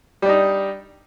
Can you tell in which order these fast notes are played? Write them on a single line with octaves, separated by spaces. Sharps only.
G3 D4 D#4